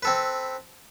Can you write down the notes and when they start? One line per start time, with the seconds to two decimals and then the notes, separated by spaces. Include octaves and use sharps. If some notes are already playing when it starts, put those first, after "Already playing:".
0.03 C4 A4 B4